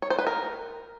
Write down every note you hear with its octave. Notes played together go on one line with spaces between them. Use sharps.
C#5
C5
B4
A#4